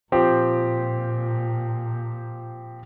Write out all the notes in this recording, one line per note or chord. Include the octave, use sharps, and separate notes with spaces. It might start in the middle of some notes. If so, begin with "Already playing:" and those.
A#2 F3 C4 G4